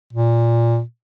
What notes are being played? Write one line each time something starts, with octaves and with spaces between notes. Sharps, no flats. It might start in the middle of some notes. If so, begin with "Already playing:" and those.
A#2